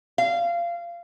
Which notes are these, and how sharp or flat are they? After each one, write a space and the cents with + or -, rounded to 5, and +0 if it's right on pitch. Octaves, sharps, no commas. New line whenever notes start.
F5 -20